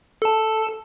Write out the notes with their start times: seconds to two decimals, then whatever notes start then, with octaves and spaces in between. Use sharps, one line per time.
0.22 A4 A5